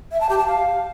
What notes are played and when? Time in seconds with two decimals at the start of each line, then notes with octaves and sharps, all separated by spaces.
0.12 E5
0.21 A5
0.29 G4
0.38 A5
0.47 F5